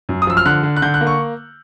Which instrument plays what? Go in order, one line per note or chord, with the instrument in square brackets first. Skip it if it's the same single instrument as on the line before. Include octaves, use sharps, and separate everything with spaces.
[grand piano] F#2
D#6
F3 E6
F6
D3 F#6
D3
F#6
D3 G6
F#6
A#3
C#6